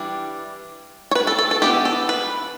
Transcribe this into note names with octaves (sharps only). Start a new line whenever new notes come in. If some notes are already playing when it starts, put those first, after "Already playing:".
Already playing: E3 G3 D4
C#5
B4
A4
A4
A4
E3 B3 D4 G4
A4
B4